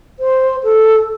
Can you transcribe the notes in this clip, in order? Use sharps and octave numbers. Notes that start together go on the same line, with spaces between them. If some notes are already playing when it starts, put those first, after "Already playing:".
C5
A4